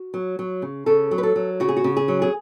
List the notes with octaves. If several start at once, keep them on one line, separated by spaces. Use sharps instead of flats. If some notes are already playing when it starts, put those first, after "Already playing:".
Already playing: F#4
F#3
F#3
C#3
C#3 A4
F#3
B4
A4
F#3
C#3 F#4
G#4
F#4
C#3
G#4
F#3
G#4